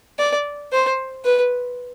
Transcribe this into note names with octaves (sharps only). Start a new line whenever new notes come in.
D5
C5
B4